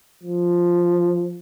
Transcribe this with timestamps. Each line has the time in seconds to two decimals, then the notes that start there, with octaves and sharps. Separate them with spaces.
0.24 F3